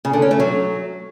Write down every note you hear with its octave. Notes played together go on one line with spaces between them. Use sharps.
C#3
D3
C#4
A3
F#3